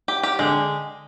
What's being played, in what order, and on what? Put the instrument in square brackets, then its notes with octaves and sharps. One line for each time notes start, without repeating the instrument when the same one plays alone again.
[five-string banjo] G4
G4
[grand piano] D3 [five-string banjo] G#3